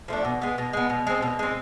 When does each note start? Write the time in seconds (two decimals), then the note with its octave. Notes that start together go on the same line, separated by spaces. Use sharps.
0.08 F3 A3 D4
0.25 B2
0.42 G#3 B3
0.58 B2
0.73 G#3 B3
0.90 B2
1.07 G#3 C4
1.22 B2
1.39 G#3 C4